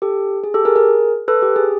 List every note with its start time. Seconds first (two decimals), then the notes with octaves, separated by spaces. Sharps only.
0.02 G4 A4
0.44 G#4
0.54 G4 A4
0.65 G#4 A#4
0.76 G#4 A#4
1.28 A4 B4
1.42 G4
1.56 G#4